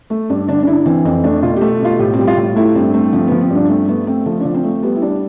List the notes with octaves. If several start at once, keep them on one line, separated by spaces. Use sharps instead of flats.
A3
G2 D4
D3 D4
D4
D3 E4
E3 C4
F2 C4
A3 D4
B2 F4
G4
A3
B2 F4
A2 G4
C4
G3
F4
A2
A3 E4
G2 C4
A3 C4
F3 C4
F3 B3
C4
G2 D4
A3 C4
A3 B3
A3 C4
F3 A4
F3 D4
C4
A3
C4
G3 B3
E4
G3 D4